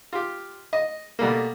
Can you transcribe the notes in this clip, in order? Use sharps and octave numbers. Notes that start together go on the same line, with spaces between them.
F4 G4
D#5
B2 G3 A3 A#3